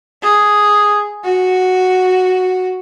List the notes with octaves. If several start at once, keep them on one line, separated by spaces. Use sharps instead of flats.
G#4
F#4